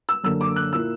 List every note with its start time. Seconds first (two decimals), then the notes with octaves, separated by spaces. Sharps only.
0.09 E6
0.24 F#2 D3 A#3 E6
0.41 D6
0.56 F#6
0.72 A#2 A#3 E4 E6